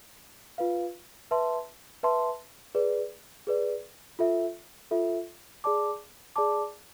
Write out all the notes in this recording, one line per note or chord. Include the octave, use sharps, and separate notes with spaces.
F4 B4 F5
B4 E5 A5 C6
B4 E5 A5 C6
G#4 B4 D5
G#4 B4 D5
F4 A4 E5
F4 A4 E5
G#4 D5 A5 D6
G#4 D5 A5 D6